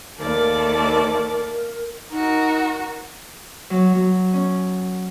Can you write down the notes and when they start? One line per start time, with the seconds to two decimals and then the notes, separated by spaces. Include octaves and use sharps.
0.19 D#2 A3 A#4 D5
2.11 D#4 F#4 A#4
3.70 F#3
3.95 F#3
4.33 C#4